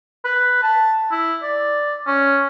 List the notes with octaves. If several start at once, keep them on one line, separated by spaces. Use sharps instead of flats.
B4
A5
E4
D5
C#4